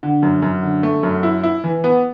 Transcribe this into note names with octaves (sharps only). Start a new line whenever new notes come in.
D3
F#2
F#2
D3
A3
F#2
E4
E4
E3
B3